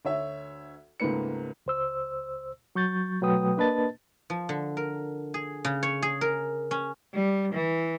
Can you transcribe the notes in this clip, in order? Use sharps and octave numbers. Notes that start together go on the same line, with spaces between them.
D2 C#5 E5
C#2 G#2 A3 A#3 B4 C#7
C#2 C5 E6
F#3 C#6 G6 A6
B2 F#3 A3 B4 G5 D#6
A#3 D4 B4 D#5 A5 A6
F3
D3
A#4
G#4
C#3
C#5
G#4
A#4
C#4
G3
E3